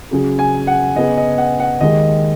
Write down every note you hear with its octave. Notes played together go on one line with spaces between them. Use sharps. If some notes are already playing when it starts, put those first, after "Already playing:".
C#3 F#3 C#4 G#4
G#5
F#5
C#3 B3 G#4 D#5
D#5
F#5
F#5
D#2 D#3 G#3 D#5